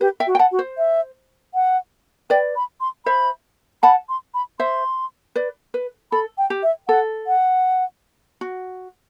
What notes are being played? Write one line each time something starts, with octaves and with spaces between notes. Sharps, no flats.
G4 B4
E5 G5
F#4
G5
F#5 A5
F#4
C5
E5
F#5
B4 D5 G5
B5
C6
C5 E5 B5
F#5 A5 B5
C6
B5
C5 E5 C6
B4 D5
B4
A4 B5
G5
G4
E5
A4 F#5
F#5
F#4